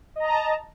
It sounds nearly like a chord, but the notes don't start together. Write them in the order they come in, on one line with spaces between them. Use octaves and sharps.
D#5 A#5 A5